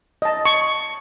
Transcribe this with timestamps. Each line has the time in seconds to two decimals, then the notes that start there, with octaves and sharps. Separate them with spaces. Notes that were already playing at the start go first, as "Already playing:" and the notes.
0.22 D#5 A5
0.45 C#6